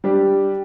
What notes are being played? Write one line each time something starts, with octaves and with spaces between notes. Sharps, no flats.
G3 D4 G4